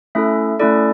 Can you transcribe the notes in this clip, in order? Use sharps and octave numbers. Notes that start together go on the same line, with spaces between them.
A3 C#4 E4 A4 E5
A3 C#4 E4 A4 D5